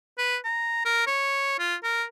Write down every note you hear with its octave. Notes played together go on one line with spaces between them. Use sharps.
B4
A#5
A#4
C#5
F4
A#4